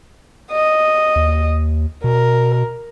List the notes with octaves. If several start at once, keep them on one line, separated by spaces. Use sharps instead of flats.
D#5
D#2
B2 A#4